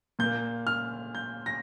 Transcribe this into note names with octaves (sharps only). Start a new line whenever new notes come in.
A#2 A#3 G6
F6
G6
A#6